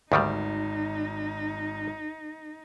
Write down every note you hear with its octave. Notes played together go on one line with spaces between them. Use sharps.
G#1 D2 D#3 G3 D#4